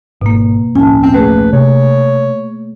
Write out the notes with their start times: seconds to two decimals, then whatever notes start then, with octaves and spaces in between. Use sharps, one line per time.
0.21 G#1 B2 A#3
0.75 D1 A#1 C#4 G#5 A5
1.03 C4
1.14 A3 A#3 G#4 B4
1.53 C3 C#5